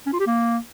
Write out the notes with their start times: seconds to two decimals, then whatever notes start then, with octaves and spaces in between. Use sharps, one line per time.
0.06 C#4
0.13 F4
0.20 G4
0.27 A#3